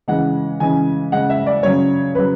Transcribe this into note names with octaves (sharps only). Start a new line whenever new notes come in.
C#3 E3 G#3 F#5
C#3 E3 G#3 G#5
C#3 G#3 F#5
E5
D5
C#3 F#3 C#5
C#3 F#3 B4